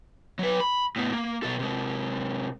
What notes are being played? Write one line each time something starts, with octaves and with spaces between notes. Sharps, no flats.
F#3 B4
B5
A2 B3
A#3
B2 A4
C3 G#3